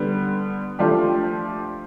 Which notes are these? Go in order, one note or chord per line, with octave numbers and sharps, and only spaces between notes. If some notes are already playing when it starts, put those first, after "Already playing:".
Already playing: D3 G3 B3
F3 A3 D4 G4